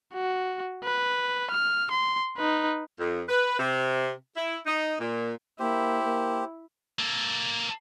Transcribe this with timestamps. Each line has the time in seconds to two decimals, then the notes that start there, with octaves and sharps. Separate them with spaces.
0.14 F#4
0.84 B4
1.52 F6
1.92 C6
2.37 D#4 B4
2.99 F2
3.29 B4
3.59 C3
4.35 E4
4.66 D#4
5.00 A#2
5.59 A#3 E4 G4 C5
6.04 A#3
6.99 A#3 A4